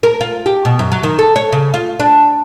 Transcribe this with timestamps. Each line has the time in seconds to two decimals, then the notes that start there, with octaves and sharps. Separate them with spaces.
0.03 A#4
0.21 F4
0.46 G4
0.65 B2
0.79 F#2
0.92 F#3
1.03 D#3
1.19 A4
1.36 C#5
1.52 C#3
1.74 F4
2.00 D4